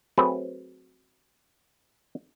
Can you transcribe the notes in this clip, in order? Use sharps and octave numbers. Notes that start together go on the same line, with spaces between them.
F#3 A3 C4 G#4 B4